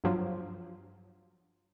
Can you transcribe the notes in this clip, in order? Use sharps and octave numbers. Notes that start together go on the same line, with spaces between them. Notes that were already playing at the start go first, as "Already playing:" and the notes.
G2 F3 F#3